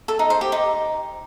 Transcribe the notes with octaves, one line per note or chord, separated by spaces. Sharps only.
A4
D#4
C5
G4
D#4